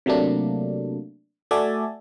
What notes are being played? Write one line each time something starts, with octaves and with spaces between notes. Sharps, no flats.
C3 F#3 A3 A#3 D4
A3 F#4 D5 E5 G#5 A5